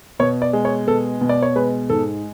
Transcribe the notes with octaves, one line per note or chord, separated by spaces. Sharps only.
B2 C#5
D5
G#3
C#5
B2 A4
B2
D5
C#5
G#3 B4
G#2 A4